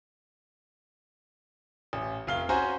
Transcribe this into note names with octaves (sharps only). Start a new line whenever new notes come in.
A1
F1 F5 G7
C#4 F#4 C5 G#5 A#5